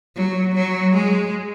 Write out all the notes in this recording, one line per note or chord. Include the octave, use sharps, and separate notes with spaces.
F#3
F#3
G#3